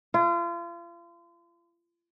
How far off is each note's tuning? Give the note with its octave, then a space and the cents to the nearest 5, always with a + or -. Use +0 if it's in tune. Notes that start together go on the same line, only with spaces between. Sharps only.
F4 -35